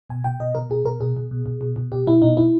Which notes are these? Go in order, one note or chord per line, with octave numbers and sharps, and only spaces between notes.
B2 G#5
B2 G5
B2 D#5
B2 A#4
B2 G#4
B2 A#4
B2 G#4
B2
B2
B2
B2
B2
B2 G4
B2 E4
B2 D#4
B2 E4